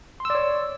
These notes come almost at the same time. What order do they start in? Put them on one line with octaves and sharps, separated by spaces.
C6 E6 D5 C#5